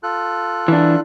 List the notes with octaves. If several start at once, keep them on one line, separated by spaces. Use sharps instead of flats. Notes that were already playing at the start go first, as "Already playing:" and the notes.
F4 A4 F#6
E3 D4